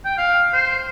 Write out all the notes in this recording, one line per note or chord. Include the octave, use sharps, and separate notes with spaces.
G5
F5
C5